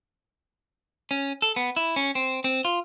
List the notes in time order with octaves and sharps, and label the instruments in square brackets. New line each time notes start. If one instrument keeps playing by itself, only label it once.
[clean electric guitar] C#4
A4
B3
E4
C#4
C4
C4
F4